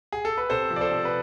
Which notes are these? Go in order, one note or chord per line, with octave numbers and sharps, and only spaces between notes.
G#4
A4
B4
C3 A4 C5
F3
D5
A4 C5
C3
B4